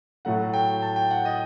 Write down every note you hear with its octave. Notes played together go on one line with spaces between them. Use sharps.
A2 F#3 A3 F#5
G5
A5
G5
F#5
D#5